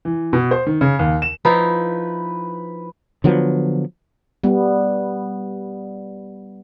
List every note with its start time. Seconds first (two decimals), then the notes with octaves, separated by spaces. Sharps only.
0.05 E3
0.33 B2
0.51 C5
0.66 D#3
0.81 C#3
0.99 D#2
1.22 E7
1.45 F3 D#4 E4 B4
3.24 D3 F3 F#3 B3
4.44 G3 B3